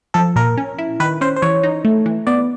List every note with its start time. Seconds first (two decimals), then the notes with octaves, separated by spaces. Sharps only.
0.14 F3 A4
0.36 A#2 A#4
0.57 C#4
0.78 E4
1.00 D#3 B4
1.21 C#4 C5
1.36 C5
1.42 E3 C#5
1.63 D#4
1.85 A3
2.06 E3
2.27 B3 D5